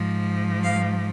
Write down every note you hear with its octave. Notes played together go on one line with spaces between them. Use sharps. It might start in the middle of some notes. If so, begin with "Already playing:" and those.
Already playing: G#2 F3
F5